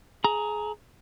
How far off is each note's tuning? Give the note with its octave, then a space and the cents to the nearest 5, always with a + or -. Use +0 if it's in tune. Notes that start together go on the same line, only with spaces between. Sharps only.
G#4 +20 A#5 +0